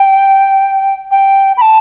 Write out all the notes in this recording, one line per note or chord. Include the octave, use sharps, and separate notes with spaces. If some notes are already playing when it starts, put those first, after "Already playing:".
Already playing: G5
G5
B5
A5